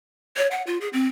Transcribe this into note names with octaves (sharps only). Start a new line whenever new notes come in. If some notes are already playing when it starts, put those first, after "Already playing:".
C#5
F#5
F4
G#4
C4